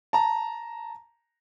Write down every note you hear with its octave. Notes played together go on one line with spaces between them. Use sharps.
A5 A#5